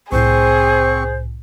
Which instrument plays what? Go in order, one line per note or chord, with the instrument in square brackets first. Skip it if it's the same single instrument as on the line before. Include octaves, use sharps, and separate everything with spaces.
[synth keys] C2 A2 [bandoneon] C4 C#6 [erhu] G#4 [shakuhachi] C5